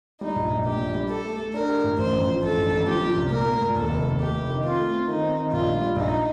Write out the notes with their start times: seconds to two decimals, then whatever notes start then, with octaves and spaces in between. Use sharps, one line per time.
0.21 G3 D#4
0.36 A#1
0.50 A#1
0.65 A#2 G4
0.81 A#1
0.95 G3
1.09 G4 A4
1.25 A3
1.39 A3
1.54 D4 A#4
1.68 G4
1.84 A2
1.98 A1 C5
2.12 A1
2.28 F3
2.42 A1 A4
2.58 A1
2.71 A1
2.86 F3 G4
3.01 F3
3.17 C2
3.31 A#2 A#4
3.46 A#3
3.61 A#2
3.75 D#2 A4
3.90 F1
4.04 D#2
4.19 A3 G4
4.35 F1
4.49 D#3
4.63 C4 F4
4.79 A3
4.93 C4
5.08 D#3 D#4
5.23 C4
5.38 D#3
5.52 A#1 F4
5.67 G3
5.82 G3
5.96 A#1 D#4